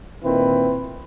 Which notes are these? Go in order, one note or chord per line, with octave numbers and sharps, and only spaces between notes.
A#2 D#3 C4 E4 B4